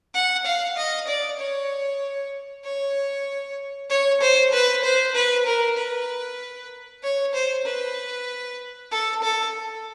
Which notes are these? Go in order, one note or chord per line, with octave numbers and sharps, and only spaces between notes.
F#5
F5
D#5
D5
C#5
C#5
C#5
C5
B4
C5
B4
A#4
B4
C#5
C5
B4
A4
A4